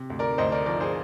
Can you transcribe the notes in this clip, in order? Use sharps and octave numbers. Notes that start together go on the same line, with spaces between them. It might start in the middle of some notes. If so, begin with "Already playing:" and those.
Already playing: C3
D2
A#4 D5
D2 C5 D#5
A#4 D5
F3 A#4 D5
G#4 C5